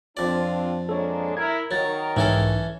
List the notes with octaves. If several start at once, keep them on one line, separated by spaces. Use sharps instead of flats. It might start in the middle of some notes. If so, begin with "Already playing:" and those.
F2 C4 D4 F4 D5
G#3 A#3 D4 A4 C#5
E4 A#4 G#6
D#3 F#3 A#4 C#5 A6
B1 G#2 E3 C#4 A4